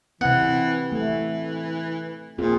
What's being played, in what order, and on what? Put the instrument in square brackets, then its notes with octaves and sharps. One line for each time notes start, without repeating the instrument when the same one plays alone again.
[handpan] C3 C4 [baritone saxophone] E3 [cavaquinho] F#5
[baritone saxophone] E3 [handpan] A3
[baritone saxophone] A#2 [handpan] C4 F4 G#4